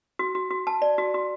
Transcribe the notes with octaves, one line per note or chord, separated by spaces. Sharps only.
F#4
F#4
F#4
A5
D5
F#4
F#4